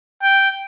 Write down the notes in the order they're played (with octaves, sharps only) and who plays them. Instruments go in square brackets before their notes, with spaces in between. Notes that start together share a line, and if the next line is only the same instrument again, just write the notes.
[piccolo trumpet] G5